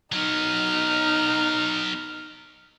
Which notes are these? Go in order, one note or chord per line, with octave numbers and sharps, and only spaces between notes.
F#3 B3 D#4 F6